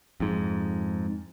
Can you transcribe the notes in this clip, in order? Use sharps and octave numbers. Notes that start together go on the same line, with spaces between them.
F2 G#2